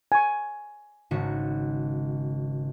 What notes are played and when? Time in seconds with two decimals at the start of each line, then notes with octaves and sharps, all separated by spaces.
0.12 G#5 C#6
1.11 G#1 C#3 F#4